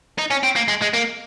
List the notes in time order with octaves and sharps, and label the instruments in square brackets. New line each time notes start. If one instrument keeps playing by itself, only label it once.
[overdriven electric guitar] D#4
C#4
C4
A#3
G#3
G#3
A#3